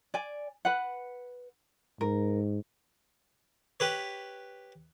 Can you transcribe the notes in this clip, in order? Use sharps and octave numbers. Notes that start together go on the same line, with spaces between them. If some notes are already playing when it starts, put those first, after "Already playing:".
D5 G#5
B4 F#5
G#2 A#4
G4 B4 C#5